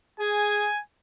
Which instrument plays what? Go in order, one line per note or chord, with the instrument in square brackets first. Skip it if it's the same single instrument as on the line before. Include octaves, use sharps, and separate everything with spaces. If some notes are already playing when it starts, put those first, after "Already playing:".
[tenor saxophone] G#4 [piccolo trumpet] G#5